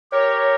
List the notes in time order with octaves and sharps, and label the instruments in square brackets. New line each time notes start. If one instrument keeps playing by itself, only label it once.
[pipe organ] G4 A#4 [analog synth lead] C#5